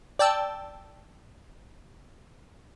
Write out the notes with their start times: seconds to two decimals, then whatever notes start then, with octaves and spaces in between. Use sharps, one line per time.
0.19 D5 G5 A5 E6